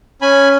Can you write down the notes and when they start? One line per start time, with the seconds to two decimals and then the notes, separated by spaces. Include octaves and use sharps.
0.22 C#4 G#5 B5